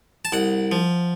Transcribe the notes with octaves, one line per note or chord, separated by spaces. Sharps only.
A5
C2 F#5
F3